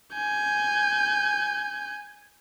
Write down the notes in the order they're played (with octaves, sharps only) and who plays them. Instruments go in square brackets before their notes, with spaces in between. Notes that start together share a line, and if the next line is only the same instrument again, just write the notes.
[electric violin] G#5 G6